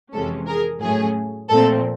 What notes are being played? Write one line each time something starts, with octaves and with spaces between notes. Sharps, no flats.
F2 C3 E3 G#3 C#4 A4
G#4 A#4
A2 F#3 A3 C#4 G#4
A#2 F3 A3 C4 A4